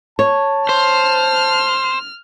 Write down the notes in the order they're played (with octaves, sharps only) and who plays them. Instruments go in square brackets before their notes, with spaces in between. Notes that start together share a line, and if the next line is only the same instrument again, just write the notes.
[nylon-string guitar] C#5 [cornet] A5
[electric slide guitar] C5 [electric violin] F6